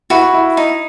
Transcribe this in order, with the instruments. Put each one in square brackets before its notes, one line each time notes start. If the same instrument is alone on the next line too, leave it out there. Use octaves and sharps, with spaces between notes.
[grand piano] E4 [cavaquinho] F#4 B4
[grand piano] E4
[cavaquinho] D#4